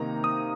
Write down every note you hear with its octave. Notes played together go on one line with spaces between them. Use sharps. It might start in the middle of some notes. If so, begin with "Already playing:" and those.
Already playing: C3 D#3 A#3 D#4 A#5
D#6